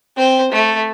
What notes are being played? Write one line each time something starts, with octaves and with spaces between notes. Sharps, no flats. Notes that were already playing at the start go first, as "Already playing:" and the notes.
C4 C5
A3